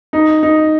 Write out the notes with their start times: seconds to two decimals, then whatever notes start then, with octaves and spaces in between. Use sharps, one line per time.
0.13 D#4
0.43 D#4